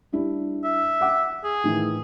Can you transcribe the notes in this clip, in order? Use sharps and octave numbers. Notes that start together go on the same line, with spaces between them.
G3 D4 E4
E5
F#5 D6
G#4
A2 D#3 E3